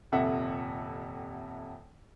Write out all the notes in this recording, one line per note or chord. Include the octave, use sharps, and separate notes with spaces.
D#1 F2 C3 A4 E5 F#5